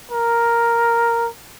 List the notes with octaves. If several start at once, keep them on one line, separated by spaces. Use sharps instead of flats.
A#4